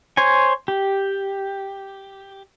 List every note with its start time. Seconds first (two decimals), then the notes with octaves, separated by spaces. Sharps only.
0.17 C5 C#5 G#5
0.68 G4